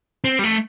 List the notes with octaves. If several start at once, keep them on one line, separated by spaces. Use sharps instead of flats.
C4
G3
A3